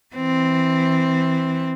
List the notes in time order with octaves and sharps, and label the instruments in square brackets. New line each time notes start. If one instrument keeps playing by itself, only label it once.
[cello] E3 C4